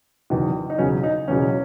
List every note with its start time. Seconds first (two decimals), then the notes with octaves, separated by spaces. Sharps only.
0.30 F#1 E2 D#3 F#3
0.70 D#4
0.78 E1 E2 C#3 F#3 C#4
1.04 D#4
1.27 E1 E2 C#3 F#3 C#4